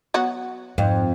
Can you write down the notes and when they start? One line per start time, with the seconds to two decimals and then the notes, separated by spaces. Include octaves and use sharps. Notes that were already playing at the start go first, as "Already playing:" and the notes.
0.14 F#3 B3 F#4
0.78 F2 G#2